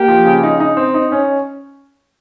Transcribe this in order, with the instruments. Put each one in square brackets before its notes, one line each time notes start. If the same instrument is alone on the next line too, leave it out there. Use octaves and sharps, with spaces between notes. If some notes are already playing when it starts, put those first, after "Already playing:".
Already playing: [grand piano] A#3 [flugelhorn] G4
[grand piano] F3
C#3
D#4
D#4
C4
D#4
C#4